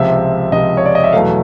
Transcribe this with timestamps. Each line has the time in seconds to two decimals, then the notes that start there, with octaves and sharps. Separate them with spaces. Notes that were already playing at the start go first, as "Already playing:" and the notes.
Already playing: C#2 C3 F3 E5
0.52 C#2 C3 F3 D#5
0.77 C#5
0.86 D5
0.95 D#5
1.04 E5
1.13 E2 B2 F#3 A3 F5